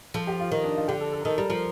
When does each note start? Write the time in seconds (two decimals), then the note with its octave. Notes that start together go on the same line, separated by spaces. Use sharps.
0.14 F3 A4
0.27 G4
0.39 F4
0.52 D#3
0.64 D4
0.76 F4
0.88 D3 G4
1.01 A4
1.13 A4
1.21 A#4
1.25 D#3 A4
1.38 G3 A#4
1.50 F3 A#4